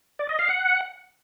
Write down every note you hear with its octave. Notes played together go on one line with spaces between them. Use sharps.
D5
D#5
F5
F#5